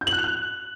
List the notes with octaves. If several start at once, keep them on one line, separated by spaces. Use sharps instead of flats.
G6
F#7
F#6
F7
F#6